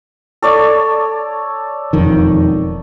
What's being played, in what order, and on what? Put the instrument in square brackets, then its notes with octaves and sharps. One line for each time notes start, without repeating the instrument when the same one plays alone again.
[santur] A4 C#5 D5
[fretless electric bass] E1 F2 D#3